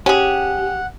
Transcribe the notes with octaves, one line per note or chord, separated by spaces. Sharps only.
C#4 G4 G#4 F#5